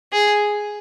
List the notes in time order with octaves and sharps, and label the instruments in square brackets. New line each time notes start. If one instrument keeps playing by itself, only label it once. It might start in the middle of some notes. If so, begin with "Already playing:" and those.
[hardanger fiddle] G#4